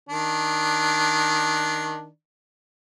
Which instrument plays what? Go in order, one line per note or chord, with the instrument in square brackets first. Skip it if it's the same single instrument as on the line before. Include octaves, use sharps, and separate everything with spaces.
[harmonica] D#3 D4